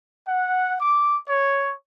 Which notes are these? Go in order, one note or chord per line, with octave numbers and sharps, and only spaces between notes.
F#5
D6
C#5